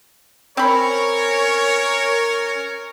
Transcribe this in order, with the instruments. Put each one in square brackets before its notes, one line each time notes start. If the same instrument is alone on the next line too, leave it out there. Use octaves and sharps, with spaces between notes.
[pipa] C4 B5 [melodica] C#4 [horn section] A#4 [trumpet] C#5